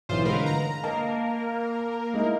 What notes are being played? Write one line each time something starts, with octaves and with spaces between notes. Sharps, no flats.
B1 E3 B3 F4 C5
D3 G#3 A#4 B4 F5
A#5
A#3 A#4 D#5 A5
G#3 D#4 E4